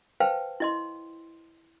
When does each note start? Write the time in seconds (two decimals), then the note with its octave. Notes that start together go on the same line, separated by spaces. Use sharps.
0.20 B4 C5 F5 G5 A5
0.60 E4 D#5 C6